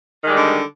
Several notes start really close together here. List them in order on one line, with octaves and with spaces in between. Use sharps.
D#3 G#3 G3 D3